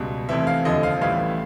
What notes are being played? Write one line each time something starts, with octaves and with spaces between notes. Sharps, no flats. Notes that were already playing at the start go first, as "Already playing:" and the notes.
Already playing: C#2 B2 G3
F1 F2 C3 E3 E5
F5
F1 D#2 D3 F3 D#5
F5
A1 A2 E3 G3 F5